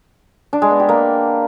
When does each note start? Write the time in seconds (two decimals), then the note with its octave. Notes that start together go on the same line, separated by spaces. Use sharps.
0.53 D4
0.62 G#3
0.71 B3
0.80 G4
0.89 A#3